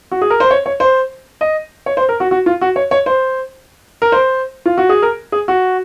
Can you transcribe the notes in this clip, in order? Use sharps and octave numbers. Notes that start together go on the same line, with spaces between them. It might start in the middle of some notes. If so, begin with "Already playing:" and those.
F#4
G#4
A#4
C5
C#5
C#5
C5
D#5
C#5
C5
A#4
F#4
F#4
F4
F#4
C#5
C#5
C5
A#4
C5
F4
F#4
G#4
A#4
G#4
F#4